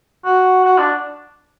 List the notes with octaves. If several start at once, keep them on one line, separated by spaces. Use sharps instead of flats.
F#4
F#4
D4